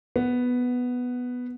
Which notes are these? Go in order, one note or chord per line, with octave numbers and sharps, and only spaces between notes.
B3